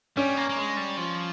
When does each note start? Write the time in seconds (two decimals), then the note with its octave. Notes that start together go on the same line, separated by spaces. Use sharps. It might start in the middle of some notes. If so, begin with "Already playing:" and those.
0.17 G3 C#4
0.37 A#3
0.49 A#3
0.57 G#3
0.77 G3
0.97 F3